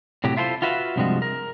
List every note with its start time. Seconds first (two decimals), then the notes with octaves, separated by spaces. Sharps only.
0.24 A2 C3 F#3 G4
0.37 E4 F4 A4 B4 C5
0.62 F4 F#4 B4 E5 F5
0.96 G2 C3 F3 G3 G#3 F#4
1.22 A#4